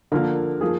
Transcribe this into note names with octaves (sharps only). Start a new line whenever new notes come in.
D3 F3 A#3 A#4
F3 A#3 G#4